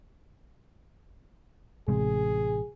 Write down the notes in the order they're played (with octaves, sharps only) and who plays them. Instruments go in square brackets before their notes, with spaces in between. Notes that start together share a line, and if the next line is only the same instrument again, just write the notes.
[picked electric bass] A1 C3 G#3 [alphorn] G#4